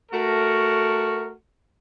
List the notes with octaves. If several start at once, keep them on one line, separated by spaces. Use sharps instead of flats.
A3 F#4 A#4